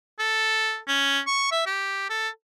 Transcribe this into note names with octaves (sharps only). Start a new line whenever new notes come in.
A4
C#4
C#6
E5
G4
A4